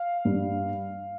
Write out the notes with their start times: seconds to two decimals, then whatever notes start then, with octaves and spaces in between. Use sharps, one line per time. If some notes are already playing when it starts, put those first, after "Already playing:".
Already playing: F5
0.25 G2